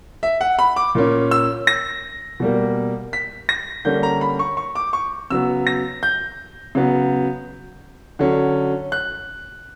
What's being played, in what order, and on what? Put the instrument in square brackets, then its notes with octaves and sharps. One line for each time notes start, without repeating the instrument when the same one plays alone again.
[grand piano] E5
F#5
B5
D6
A#2 A#3 C#4
E6
A#6
B2 G3 A#3
B6
A#6
D3 G3 A#3 C#4 G6
A#5
B5
C#6
C#6
D6
C#6
C#3 F#3 B3 E6
A#6
G6
C#3 F#3 B3
D3 F#3 C#4
F#6